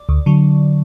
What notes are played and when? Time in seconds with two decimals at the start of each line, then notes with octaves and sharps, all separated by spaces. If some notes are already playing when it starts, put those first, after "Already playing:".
Already playing: D5
0.09 D2
0.26 D3 F#3